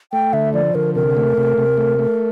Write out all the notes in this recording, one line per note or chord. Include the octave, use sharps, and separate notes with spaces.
A3 G5
D3 E5
F3 D5
D3 A#4
C3 A#4
A3
C3
C3
A3
A3